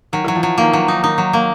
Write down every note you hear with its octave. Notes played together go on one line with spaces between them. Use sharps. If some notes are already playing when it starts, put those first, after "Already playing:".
D#3 F#3
E3
F#3
F3
F#3
D#3 A#3
F#3
D#4
D#3 D#4
F#3
A#3